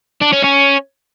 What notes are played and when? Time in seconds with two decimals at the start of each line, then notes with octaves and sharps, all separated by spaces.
0.22 D4
0.33 C#4
0.44 C#4